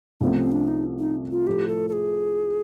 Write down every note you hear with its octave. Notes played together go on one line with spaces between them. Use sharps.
C2 C3 F3 A3 B3 C#4
C4
D4
D#4
D#4
F4
A2 F3 A3 G4
A4
A4
G#4